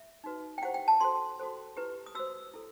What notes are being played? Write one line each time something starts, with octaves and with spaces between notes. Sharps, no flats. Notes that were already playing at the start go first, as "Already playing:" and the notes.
Already playing: E5
D#4 F#4 B4
G5
E4 G4 C5 F#5
G5
A5
F#4 A4 C5 C6
F#4 A4 C5
E4 G4 B4
D#6
F#4 C5 E6
E4 A4